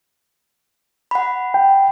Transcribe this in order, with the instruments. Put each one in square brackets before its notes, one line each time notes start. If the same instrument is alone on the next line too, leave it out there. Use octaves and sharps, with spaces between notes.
[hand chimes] F#5 B5
[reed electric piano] G5